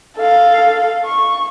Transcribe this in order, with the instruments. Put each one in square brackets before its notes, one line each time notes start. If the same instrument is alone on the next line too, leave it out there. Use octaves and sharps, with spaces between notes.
[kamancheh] A4 F5
C#6